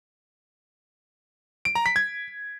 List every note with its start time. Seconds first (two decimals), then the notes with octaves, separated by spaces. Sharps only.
1.65 D7
1.75 A#5
1.86 B6
1.96 G#6